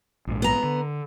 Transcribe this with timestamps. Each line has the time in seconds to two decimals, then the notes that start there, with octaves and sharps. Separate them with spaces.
0.27 A#1 G#2
0.42 B3 A#5
0.63 D3